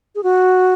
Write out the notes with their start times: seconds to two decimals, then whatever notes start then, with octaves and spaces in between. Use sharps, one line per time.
0.15 G#4
0.23 F#4